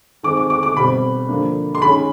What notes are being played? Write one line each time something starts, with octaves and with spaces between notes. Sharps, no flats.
D#3 G#3 C4 D6
D6
D6
D6
B2 G3 C4 B5
D3 F3 A#3 D4
C6
D#3 G#3 C#4 B5